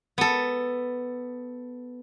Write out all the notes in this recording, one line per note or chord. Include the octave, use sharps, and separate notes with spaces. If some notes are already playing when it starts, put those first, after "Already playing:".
B3 A4